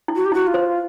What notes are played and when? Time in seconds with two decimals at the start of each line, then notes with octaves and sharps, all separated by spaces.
0.08 E4
0.15 F#4
0.25 G4
0.32 E4 F#4
0.46 F4
0.54 C5